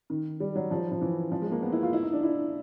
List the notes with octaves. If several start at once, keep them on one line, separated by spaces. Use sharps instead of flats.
D#3
G3
F#3
F3
F3
E3
F3
G#3
A#3
B3
E4
F4
E4
D#4
D4
E4